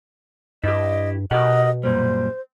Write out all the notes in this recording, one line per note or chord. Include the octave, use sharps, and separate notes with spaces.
G2 E4 G4 D#5
B2 G4 A#4 D#5 F#5
F#2 A#2 G3 C5